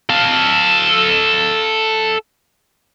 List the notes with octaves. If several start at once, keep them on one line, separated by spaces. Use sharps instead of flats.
A4 F5